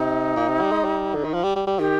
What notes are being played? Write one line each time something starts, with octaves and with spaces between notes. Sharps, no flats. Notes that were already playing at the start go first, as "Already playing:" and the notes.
Already playing: C3 D#4
A#2
C3
G3
G#3
G3
D3
D#3
F3
G3
G3
G3
D#3 G4